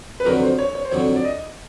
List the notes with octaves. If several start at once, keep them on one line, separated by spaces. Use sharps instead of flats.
B4
F2 D3 F#3 A#4
C5
C#5
C#5
C5
F2 D3 F#3 C#5
D5
D#5